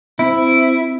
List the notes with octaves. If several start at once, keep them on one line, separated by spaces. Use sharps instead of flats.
C4 E4